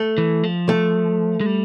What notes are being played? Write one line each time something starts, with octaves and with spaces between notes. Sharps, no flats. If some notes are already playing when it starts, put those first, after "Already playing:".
Already playing: A3
E3
F3
A3
G#3
G3